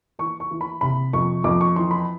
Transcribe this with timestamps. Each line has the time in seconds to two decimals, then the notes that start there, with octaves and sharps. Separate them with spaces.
0.19 E3 C#6
0.40 C#6
0.51 E3
0.61 B5
0.81 C3 B5
1.13 F2 C#6
1.44 F2 D6
1.61 C#6
1.76 E3 C6
1.91 B5